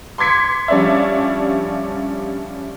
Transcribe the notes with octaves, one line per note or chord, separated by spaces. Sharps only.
C6 D6 G#6 B6 C#7
F3 G3 C#4 D4 D5 E5